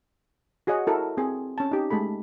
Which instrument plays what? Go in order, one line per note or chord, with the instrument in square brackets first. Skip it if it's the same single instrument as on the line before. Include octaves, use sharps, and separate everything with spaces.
[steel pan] F#4 G#4 C#5 D#5 F#5
E4 F#4 A4 A#4
C4 G#4
C#4 A5
D#4 G4
G#3 A3 A4 B5